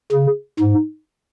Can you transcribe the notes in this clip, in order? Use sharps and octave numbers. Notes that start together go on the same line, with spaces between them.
C#3
G#2